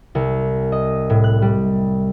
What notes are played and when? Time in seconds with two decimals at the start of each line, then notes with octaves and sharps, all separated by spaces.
0.15 C2
0.72 D#5
1.10 A2
1.24 F#6
1.42 G3